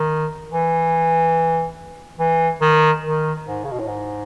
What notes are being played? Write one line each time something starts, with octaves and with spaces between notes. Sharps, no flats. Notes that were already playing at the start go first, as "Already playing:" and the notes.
Already playing: D#3
E3
E3
D#3
D#3
G#2
C#3
B2
A2
G#2